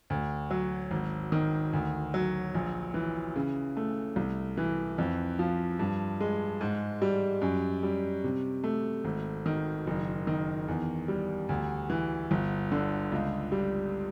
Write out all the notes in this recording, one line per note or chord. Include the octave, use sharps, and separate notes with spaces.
D2
F#3
G#1
D#3
D2
F#3
A#1
E3
C#3
A3
C2
E3
F2
F3
G2
G#3
G#2
G3
F#2
G3
C3
A3
G#1
D#3
F#1
D#3
E2
G3
D2
E3
G1
D3
C#2
G3